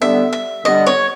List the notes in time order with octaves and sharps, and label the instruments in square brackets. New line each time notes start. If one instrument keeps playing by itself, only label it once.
[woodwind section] D3 G3 B3 [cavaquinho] E5
[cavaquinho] E5
[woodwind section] D3 G3 B3 [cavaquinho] D#5
[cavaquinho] C#5